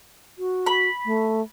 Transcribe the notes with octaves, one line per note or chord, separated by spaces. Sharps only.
F#4
B5
A3